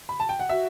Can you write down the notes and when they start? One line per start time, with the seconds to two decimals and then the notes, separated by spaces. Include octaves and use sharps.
0.09 B5
0.20 A5
0.29 G5
0.40 F#5
0.49 F#4 E5